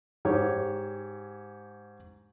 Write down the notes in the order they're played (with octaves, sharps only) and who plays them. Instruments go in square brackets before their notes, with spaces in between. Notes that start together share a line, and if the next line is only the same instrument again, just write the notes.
[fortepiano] G#2 G4 C#5